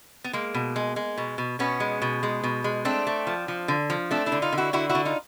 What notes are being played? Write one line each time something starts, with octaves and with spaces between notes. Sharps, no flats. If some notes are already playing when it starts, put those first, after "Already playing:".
B3
G#3 A#3
B2
G#3
G#3
B2
B2
B2 B3 C#4
G#3
B2
G#3
B2
G#3
A3 C4 D4
A3
F3
F3
D3
F3
A3 C4 D4
D4 E4
D3
D#4 F4
D3
E4 F#4
D3 E4 F#4
E4 F#4
D3
D#4 F4